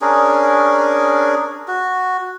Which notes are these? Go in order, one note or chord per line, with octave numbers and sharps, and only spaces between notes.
C#4 D4 G#4 A#4
F#4